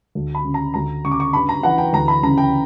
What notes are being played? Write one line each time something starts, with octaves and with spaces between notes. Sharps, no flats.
D2
B5
C#3
A#5
D2 A#5
C#3 C#6
D6
C#6
G2 B5
A#5
E3 F#5
G5
D2 A#5
B5
C#3 A#5
G5